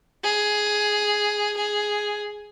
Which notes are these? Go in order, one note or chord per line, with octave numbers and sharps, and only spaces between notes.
G#4
G#4